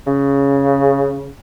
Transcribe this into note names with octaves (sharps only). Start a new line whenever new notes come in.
C#3